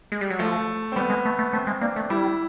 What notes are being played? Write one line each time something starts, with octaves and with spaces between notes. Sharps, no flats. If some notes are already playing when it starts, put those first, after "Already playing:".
G#3
G3
F#3
F3 A3
C4
G3 B3
G#3
A3
A3
A3 C4
G#3
A#3 D4
A3
G3 E4